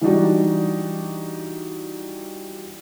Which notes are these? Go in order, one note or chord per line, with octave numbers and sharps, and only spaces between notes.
E3 G3 D4 D#4 F#4